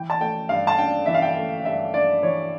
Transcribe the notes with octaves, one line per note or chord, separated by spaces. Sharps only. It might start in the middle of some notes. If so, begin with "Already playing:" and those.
Already playing: E3 G5
A5
A3 G5
G2 F5
A5
D4 G5
E3 E5
F5
G5
A3
G2 E5
D4 D5
E3 C#5